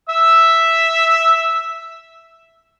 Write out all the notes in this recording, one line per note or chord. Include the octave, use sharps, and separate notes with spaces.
E5 E6